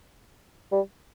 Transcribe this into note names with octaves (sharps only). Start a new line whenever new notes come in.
G3